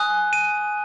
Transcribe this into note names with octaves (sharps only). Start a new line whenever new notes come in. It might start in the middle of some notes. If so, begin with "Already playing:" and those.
Already playing: G#5 D#6 F#6
D#7